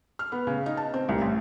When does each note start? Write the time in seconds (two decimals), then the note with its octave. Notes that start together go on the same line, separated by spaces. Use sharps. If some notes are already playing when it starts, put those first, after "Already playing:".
0.19 F6
0.32 B3
0.47 C#3
0.66 D#4
0.77 A5
0.94 C4
1.09 C2
1.21 A1